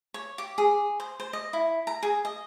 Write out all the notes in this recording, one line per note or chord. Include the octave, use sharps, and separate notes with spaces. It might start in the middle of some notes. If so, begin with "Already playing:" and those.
C#5
G4
G#4
C5
C5
D#5
E4
A#5
G#4
D#5